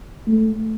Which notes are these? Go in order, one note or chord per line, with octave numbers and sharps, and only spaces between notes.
A3